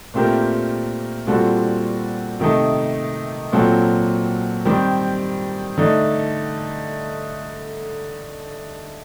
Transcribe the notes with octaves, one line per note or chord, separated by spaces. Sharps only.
A#2 A3 C4 G4 A#4
A#2 G3 C4 F#4 A4
C3 D#3 A3 D#4 A4
A#2 F#3 C4 F#4 A4
D#3 G3 C4 G4
D3 A3 D#4